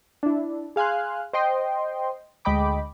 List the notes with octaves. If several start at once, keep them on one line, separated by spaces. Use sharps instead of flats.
D4 E4
G#4 F5 G#5 C6 F#6
C5 D#5 G5 C6
D2 G#3 D#5 G5 B5 D6